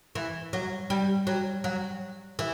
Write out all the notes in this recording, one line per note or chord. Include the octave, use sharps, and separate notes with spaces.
E3
F#3
G3
F#3
F#3
E3